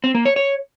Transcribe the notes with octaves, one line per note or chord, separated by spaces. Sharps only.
C4
A#3
C#5
C#5